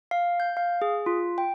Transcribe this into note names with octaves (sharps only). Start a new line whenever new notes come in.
F5
G6
F5
G#4
F4
G5